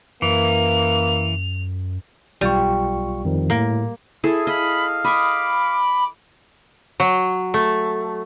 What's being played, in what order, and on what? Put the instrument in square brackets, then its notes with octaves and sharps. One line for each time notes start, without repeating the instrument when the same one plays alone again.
[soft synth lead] F#2 [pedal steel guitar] E3 [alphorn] A#3 [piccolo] F7
[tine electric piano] B1 F4 C#6 [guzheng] G3
[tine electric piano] F2 D#3 F3
[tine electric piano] A2 [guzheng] A#3
[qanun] E4 G#4 A4
[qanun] D#5 [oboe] F5 [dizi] B5
[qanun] D#5 C#6 [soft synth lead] B5 [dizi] D6
[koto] F#3
A3